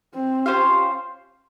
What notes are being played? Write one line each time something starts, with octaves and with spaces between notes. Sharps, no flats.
C4
C#4 F4 G4 C5 F5